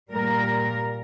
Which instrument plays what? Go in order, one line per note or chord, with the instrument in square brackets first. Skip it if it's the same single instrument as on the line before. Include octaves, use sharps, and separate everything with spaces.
[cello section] A#2 G3 A#4